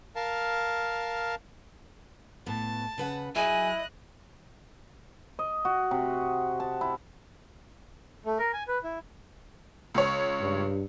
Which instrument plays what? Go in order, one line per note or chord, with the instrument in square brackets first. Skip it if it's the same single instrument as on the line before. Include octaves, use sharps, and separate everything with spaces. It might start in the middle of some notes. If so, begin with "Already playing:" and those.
[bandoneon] A#4 F5 A5
[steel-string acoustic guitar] A2 B3 [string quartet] A5
[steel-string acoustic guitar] C#3 B4 F#5
[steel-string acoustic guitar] F#3 G#4 [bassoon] E4 [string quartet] D#5 F#6 [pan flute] G#5
[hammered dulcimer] D#5
F#4
C3
A5
E4
[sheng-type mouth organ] A3
A#4
G#5
B4
E4
[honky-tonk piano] C#2 C#5
[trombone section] G2